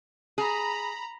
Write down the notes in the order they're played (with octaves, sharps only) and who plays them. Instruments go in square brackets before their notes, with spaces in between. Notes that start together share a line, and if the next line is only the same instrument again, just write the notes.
[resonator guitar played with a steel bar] G#4 [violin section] A#5 B5